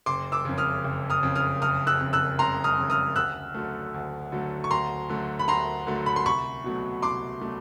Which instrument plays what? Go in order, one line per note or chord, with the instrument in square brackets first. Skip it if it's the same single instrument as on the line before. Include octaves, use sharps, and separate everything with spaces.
[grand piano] F#1 [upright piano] C6 D6
[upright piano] D6 E6
[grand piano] F2 C#3
[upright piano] D#6 F6
[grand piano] F#1
[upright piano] D#6 F6
[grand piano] F2 C#3
[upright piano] D#6 F6
[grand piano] F#1 [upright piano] D#6 F6
[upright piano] E6 F#6
[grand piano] F2 C#3
[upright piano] E6 F#6
[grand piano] F#1 [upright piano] A#5 C6
[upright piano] D#6 F6
[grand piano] F2 C#3
[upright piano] D#6 F6
[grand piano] D2 [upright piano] E6 F#6
[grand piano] D3 F#3 A3
D2
D3 F#3 A3
[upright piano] C#6
[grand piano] D2 [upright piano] A#5 C6
[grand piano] D3 F#3 A3
[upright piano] B5
[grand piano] D2 [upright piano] A#5 C6
[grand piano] D3 F#3 A3
[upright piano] B5
C6
[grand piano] C2 [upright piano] B5 C#6
[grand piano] B2 F#3 A3
[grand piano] C2 [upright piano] C6 D6
[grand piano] B2 F#3 A3